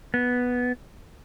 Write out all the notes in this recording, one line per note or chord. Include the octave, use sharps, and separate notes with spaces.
B3